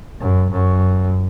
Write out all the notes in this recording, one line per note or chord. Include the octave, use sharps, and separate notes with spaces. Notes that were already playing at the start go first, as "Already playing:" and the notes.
F#2
F#2